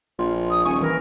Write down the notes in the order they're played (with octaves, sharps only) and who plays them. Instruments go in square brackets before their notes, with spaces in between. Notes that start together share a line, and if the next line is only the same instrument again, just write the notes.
[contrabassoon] A#1 [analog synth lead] F4
[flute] D#6
[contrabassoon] D#1 [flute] G#5 [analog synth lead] C#6
[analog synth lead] E3 [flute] A#4